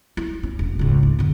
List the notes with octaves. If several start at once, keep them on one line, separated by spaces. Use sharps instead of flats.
E4
C#4
E1
C#2 G#2
G#2
F2 D3